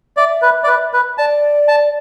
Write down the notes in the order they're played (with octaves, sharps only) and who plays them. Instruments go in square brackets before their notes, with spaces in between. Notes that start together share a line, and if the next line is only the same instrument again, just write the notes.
[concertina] D5 [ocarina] E5
[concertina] B4
D5
B4
B4
[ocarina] D5 [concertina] A5
[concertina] A5